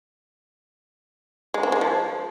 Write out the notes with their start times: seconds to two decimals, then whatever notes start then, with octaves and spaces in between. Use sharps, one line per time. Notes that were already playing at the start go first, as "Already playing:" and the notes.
1.54 G#3
1.63 C4
1.72 G#3
1.81 F3